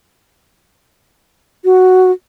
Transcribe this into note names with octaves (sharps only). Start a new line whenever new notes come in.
F#4